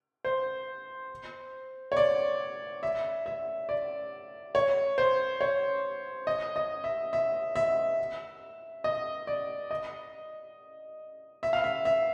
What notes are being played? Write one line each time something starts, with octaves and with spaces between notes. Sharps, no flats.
C5
C#5
D5
E5
E5
D5
C#5
C5
C#5
D#5
D#5
E5
E5
E5
D#5
D5
D#5
E5
F5
E5
E5